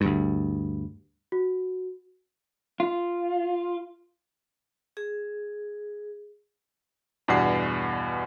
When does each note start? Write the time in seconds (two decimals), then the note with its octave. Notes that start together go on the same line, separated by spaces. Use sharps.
0.01 D2 G2
1.32 F#4
2.80 F4
4.97 G#4
7.28 E2 G2 B2 D5 F#5 C7